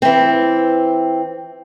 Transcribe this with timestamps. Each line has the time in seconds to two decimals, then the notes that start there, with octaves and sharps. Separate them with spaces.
0.02 E3 C4